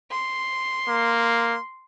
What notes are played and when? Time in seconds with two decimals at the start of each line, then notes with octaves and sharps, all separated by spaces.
0.11 C6
0.89 A#3